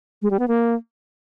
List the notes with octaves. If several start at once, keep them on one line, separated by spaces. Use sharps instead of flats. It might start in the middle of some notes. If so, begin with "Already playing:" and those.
G#3
G3
B3
A#3